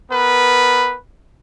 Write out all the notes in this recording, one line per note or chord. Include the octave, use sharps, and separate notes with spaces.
B3 A#4 B4